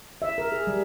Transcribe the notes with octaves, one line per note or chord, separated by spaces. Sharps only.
E5
A#4
G#4
G3